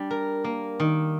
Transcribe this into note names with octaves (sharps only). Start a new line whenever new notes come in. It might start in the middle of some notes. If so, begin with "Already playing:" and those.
Already playing: G3 D4
A#4
A#3
D#3